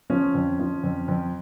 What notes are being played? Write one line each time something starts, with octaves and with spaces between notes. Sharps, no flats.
F3 C#4
F2
F3
F2
F2